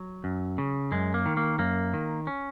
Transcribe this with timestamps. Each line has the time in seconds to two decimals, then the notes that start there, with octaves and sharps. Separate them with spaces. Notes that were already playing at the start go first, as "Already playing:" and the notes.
Already playing: F#3
0.24 F#2
0.58 C#3
0.92 F#2 G#3
1.14 A#3
1.26 D#3
1.37 A#3
1.59 F#2 A#3
1.94 D#3
2.27 C#4